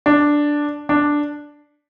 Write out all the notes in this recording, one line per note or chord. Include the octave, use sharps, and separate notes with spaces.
D4
D4